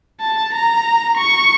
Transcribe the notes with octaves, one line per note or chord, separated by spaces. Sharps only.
A5
A#5
C#6